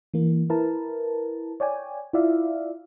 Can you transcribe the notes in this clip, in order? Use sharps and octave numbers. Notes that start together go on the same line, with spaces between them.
E3 A#3
E4 A#4 B4 A5
C#5 D5 G5 G#5
E4 F4 D5 E5 F5